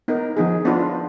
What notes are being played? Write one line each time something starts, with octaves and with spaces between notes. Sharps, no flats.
B3 D#4 A#4
F3 B3 D#4 G#4
B3 D4 F4 B4